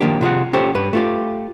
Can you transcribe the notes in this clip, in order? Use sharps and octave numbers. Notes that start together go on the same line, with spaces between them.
D#3 F3 A#3 D4 G4
C3 F4 G#4 F#5
C#4 G4 A4 C5 C#5
G2 B4
A3 F4 G4